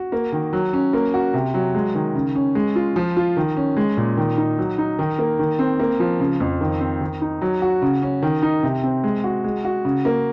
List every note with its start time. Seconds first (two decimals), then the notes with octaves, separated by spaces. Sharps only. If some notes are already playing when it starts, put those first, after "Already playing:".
Already playing: F#4
0.12 A#3
0.32 D#3
0.53 F#3
0.73 C#4
0.93 A#3
1.14 F#4
1.34 C3
1.54 F#3
1.75 G#3
1.95 D#3
2.15 C#3
2.35 C#4
2.55 G#3
2.76 F4
2.96 F3
3.17 F4
3.37 D#3
3.57 C#4
3.77 G#3
3.97 A#2
4.17 D#3
4.38 D#4
4.58 F#3
4.78 D#4
4.99 D#3
5.19 A#3
5.39 D#3
5.59 C4
5.80 A#3
6.00 F3
6.20 C#3
6.40 F2
6.61 D#3
6.81 C4
7.01 D#3
7.21 D#4
7.42 F#3
7.62 F#4
7.82 C#3
8.02 C#4
8.22 D#3
8.42 D#4
8.63 C3
8.84 C4
9.04 G#3
9.24 F#4
9.44 G#3
9.65 F#4
9.85 C#3
10.05 A#3